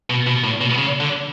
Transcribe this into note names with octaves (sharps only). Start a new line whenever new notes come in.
B2
B2
A2
B2
C#3
D3